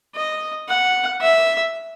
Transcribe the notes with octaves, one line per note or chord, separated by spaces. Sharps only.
D#5
F#5
E5